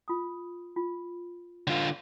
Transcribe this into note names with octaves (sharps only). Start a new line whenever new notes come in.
F4 D#6
F4
D3 F4